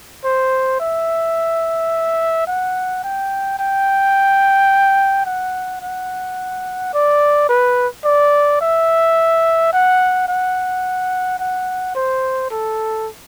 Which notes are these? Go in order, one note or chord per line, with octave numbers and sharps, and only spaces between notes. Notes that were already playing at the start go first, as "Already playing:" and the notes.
C5
E5
F#5
G5
G5
F#5
F#5
D5
B4
D5
E5
F#5
F#5
F#5
C5
A4